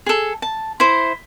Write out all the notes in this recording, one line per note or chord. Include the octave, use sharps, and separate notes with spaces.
G#4 A4
A5
E4 C5